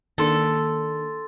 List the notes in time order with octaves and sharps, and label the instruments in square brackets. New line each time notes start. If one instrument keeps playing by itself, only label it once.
[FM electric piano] D#3 A#3 D4 [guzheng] A4 [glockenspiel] C6 A6